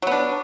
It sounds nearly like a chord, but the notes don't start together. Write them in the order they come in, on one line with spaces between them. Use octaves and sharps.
F#3 B3 D4